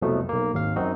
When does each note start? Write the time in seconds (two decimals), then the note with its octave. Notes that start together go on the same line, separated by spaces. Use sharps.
0.02 C2 F2 B2 F3 F#3 A3
0.29 B1 A#3
0.53 G#1 D#2 F5
0.76 F#2 C4 D#4 F#4